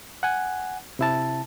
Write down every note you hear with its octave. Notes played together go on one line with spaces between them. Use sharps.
F#5 G#5
C3 E4 A5